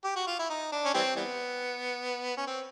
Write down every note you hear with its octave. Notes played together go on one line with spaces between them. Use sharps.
G4
F#4
F4
E4
D#4
D4
C#4
E3 G3 C4
E3 G3 B3
C#4
C4